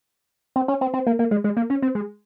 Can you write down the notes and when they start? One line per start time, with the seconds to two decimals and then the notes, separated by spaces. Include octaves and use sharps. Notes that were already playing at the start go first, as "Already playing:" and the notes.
0.56 C4
0.68 C#4
0.81 C4
0.94 C4
1.07 A#3
1.19 A#3
1.31 G#3
1.44 G#3
1.57 A#3
1.70 C#4
1.82 C4
1.95 G#3